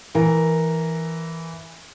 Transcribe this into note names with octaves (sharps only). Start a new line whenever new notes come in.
E3 A#4